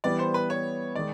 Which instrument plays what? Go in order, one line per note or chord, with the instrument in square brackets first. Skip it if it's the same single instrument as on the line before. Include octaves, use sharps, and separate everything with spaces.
[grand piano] E3 G3 B3 [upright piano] D5
[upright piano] C5
B4
C#5
[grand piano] D#3 G#3 [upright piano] D5